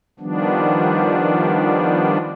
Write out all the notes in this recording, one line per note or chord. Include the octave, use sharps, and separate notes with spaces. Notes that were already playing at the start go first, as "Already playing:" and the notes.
D#3 F3 G3 B3 D4